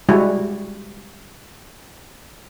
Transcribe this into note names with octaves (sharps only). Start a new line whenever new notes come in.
G3 G#3 E4 F#4